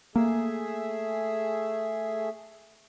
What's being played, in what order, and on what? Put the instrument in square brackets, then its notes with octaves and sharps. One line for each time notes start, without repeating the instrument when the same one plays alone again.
[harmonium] A3 G#4 E5 [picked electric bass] A#3